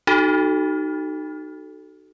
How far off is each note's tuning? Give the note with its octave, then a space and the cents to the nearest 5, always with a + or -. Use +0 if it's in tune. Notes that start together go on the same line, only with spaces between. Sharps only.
D#4 -20 F#4 +30 A4 -10